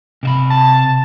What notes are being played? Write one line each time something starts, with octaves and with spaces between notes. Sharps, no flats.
C3 E5 B5
A5